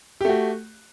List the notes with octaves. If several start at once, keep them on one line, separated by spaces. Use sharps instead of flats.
A3 F#4 G4